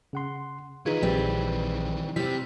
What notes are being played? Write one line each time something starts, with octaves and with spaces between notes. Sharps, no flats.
C#3 F#5 C6
D#3 E3 D#4 F4 G#4 B4
A#1 G3 C4
C3 G3 C4 E4 B6